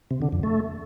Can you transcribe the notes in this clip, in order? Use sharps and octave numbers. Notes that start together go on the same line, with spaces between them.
C3
D3
F2
A3